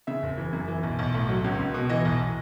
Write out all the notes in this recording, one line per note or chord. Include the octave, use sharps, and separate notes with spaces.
C#3 E5
F#1
E3
F#2
E3
B1
B1
A2
F#3
C#2
C#2
B2
E3 D#5
B1